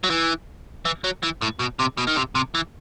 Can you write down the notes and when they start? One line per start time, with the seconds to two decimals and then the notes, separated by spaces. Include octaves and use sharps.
0.04 F#3
0.10 E3
0.85 E3
1.04 F#3
1.23 E3
1.42 A2
1.60 B2
1.80 C3
1.98 B2
2.07 D#3
2.16 C3
2.35 C3
2.55 E3